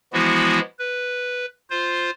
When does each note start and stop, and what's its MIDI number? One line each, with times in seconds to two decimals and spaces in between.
0.13 0.60 52
0.13 0.60 53
0.13 0.60 56
0.13 0.60 59
0.13 0.60 64
0.13 0.60 66
0.79 1.46 71
1.70 2.11 65
1.70 2.11 72